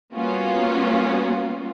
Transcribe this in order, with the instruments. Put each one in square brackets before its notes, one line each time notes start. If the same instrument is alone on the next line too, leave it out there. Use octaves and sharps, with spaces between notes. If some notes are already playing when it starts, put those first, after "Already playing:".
[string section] G3 A#3 B3 C#4 F4 F#4